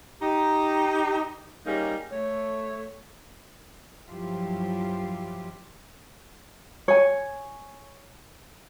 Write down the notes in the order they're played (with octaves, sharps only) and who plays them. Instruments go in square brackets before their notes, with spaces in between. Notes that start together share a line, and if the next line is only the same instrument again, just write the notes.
[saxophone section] D#4 G4
G3 A#3 C#4 D#4 G#4
A3 C#5
[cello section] G2 F3 F#3 E4 F4 G4
[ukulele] C#5 G#5